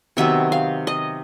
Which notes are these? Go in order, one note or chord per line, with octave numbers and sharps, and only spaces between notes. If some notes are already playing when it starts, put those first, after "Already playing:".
C3 D#3 F#3 B3 E5
F5
D#5